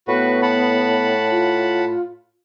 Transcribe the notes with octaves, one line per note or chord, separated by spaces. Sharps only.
A2 B3 F#4 B4
F#5 A5 B5
F4